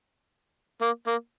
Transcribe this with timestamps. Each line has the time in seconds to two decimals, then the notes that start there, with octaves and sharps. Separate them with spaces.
0.82 A#3
1.07 A#3